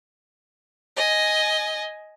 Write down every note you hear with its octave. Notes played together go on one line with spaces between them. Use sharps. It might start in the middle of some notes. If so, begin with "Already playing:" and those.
D#5 G#5